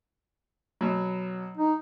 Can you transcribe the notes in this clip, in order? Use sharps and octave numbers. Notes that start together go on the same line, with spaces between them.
B2 F#3
D#4